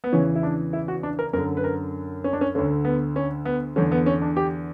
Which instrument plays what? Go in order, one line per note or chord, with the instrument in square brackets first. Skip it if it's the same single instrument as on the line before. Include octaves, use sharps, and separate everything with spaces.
[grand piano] B3
E2 C#3 E3 C#4
E4
D4
E4
F#4
D4
A#4
F#2 A#4
D3
B4
A#4
C#4
D4
C#4
D2 D3 C#4
B3
C#4
B3
E2 D3 C#4
B3
C#4
D4
G4